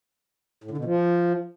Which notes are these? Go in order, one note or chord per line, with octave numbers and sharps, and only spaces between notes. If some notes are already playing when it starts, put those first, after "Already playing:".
A2
D3
B2
F3